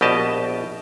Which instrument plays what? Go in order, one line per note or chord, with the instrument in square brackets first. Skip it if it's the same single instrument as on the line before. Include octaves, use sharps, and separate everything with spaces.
[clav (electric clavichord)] A#1 B2 G4 D#5 A5